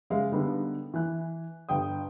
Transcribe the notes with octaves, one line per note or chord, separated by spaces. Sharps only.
F#1 G#3 E5 F5
D3 G3 B3 D#4
E3 G#5 F#6
G1 G5 D#6